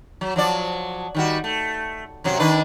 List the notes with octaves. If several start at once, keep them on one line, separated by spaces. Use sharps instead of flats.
F#3
F3 F#3 D5
D#3 G3 F#4
A3
F#2 C3 F#3
D#3 D4 B4